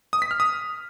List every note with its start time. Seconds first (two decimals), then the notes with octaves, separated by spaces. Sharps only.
0.13 D#6
0.22 B6
0.31 F6
0.40 D#6